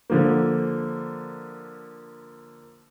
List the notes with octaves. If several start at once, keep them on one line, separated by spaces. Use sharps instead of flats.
D3 F3 A#3